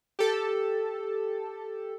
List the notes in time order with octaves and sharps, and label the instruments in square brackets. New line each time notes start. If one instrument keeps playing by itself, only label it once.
[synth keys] G4 A4